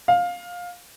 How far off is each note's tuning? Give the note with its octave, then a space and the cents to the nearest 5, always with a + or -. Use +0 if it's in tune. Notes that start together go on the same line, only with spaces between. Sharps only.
F5 +15